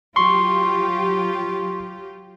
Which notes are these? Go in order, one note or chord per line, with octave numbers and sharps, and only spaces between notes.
F#3 F4 G4 C6 C#6